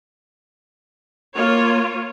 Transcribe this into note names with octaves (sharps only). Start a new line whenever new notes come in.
A#3 F4 C#5